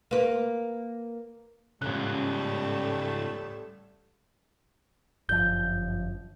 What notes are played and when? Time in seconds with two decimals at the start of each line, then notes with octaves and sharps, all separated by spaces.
0.11 A#3 B4
1.82 A1 G#2 C#3 G3 A3 F#6
5.29 G1 F#2 F3 G6